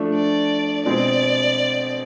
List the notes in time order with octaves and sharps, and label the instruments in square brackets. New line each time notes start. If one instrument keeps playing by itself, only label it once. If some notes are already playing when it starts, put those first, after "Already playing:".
Already playing: [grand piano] F3 A3 D4
[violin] D5
[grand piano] B2 G#3 C4 [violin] D5